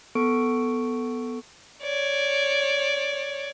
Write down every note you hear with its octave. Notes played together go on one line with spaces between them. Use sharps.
B3 A4 C#6 D7
C#5 D5